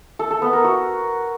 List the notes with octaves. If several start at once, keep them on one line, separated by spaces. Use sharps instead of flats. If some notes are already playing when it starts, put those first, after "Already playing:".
A4
A4
B3
A#4
F#4